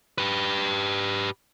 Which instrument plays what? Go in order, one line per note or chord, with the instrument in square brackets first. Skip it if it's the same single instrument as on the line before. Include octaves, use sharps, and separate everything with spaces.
[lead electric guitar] G4 B4